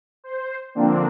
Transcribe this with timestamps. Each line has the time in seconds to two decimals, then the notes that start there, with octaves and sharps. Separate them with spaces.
0.24 C5
0.75 D3 F3 A#3 C4 D4